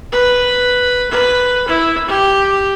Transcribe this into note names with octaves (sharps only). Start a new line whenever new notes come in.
B4
B4
E4
G4